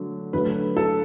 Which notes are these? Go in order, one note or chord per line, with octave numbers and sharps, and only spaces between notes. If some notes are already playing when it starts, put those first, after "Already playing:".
Already playing: D3 F#3 A3
D3 F#3 A3 B4
A4